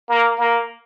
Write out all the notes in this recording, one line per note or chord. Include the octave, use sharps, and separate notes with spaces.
A#3
A#3